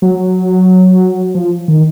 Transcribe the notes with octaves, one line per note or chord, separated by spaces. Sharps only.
F#3
F3
D#3